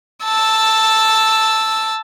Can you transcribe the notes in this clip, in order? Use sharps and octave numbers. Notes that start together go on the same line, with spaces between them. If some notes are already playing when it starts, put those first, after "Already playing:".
A5 E6